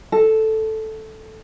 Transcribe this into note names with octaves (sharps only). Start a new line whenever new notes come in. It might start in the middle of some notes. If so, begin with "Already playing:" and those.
A4